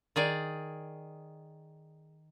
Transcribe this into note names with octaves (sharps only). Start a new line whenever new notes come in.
D#3 G#4 D5